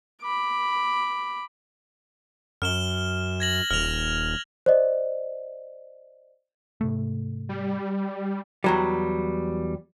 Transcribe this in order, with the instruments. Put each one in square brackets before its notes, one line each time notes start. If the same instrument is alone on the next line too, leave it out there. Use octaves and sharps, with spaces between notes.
[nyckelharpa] B5 D6
[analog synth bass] F#2 [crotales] F6 E7 G7
[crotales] G#6 A#6 F#7
[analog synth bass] D#1 [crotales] F6 F7
[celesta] C5 D5 D#5
[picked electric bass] G#2 C3 A3
[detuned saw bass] G3
[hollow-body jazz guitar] E2 F#3 G3